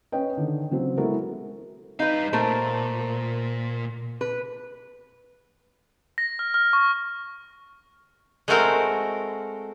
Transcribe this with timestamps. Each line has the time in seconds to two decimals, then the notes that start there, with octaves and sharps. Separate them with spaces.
0.12 C#4 B4 C#5 D#5 G5
0.37 D3 D#3
0.71 C#3 F#3 C4
0.97 G#3 B3 E4 F#4 A4 A#4
1.99 G3 D#4 B4 F5
2.33 A#2 A3 A#4 C5
4.21 B4
6.18 A#6
6.39 F6
6.54 F6
6.73 C#6
8.48 G#3 A3 C4 F#4 A#4 C5